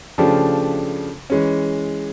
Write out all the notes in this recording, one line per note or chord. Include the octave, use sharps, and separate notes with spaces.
C#3 F3 A3 D4 G4
E3 G#3 C#4